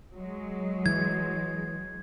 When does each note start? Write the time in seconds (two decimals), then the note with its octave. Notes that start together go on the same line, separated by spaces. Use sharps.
0.15 F#3 G#3
0.86 E3 G#6